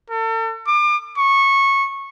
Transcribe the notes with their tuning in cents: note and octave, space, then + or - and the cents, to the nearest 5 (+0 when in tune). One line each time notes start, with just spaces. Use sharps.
A4 +40
D6 +35
C#6 -15